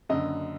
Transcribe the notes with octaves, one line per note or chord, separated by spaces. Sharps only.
F#1 F#2 D3 D#5